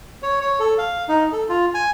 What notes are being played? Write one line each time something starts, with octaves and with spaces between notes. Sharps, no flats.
C#5
C#5
A4
F5
D#4
A4
F4
G#5